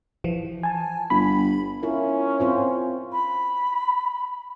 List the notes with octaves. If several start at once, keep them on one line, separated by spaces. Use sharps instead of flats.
E3 F3
G#5 A5
G1 B5
C#4 E4 F4 A#4
C4 F4 C5
B5